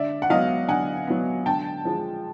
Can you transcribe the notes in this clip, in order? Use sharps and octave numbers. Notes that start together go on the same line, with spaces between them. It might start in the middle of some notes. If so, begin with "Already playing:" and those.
Already playing: D3 D5 E5
F#5
F#3 B3 D#5 F5
D3 F#5 G#5
F#3 B3
D3 G5 A5
F3 G#3